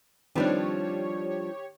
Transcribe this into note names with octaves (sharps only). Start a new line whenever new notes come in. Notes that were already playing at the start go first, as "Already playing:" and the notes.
D#3 F3 G3 C4 D4 G4 B4 C#5